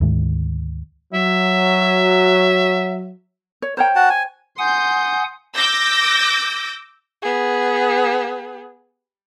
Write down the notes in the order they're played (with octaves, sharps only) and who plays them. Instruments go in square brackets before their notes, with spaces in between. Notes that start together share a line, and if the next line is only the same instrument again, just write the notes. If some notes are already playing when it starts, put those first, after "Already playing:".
[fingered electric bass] D2 G#2 D#3 G#3
[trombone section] F#3 [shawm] E5
[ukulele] C#5
[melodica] A#4 [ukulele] C5 C#5 G5
[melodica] F#4 F#5 A5
G#5
[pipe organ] F#5 G#5 D#6 [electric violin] C6 G6
[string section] D6 E6 G6 A#6
[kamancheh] B3 G#4